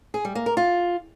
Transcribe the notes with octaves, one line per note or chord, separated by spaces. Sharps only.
G#4
G3
A#3
A#4
F4